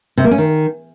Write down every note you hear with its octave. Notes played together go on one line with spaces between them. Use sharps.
C3
A#3
C#4
D#3